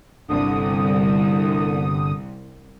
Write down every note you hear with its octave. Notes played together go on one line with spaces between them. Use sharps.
G1 C2 D3 D#6